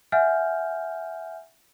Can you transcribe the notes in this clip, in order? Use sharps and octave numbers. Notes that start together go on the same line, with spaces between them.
E5 F#5 G#5 F6 G6